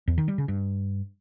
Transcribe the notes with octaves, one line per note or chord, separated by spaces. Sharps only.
E2
D#3
G3
C#3
G2